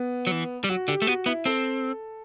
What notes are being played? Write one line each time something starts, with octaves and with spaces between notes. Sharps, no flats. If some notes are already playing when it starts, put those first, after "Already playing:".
Already playing: B3
F#3
E3
G3
F#3 F#4
D3 G4
A3
B3 F#4
B3 E4
C4 A4